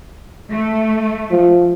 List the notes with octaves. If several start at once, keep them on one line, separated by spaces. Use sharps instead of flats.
A3
F3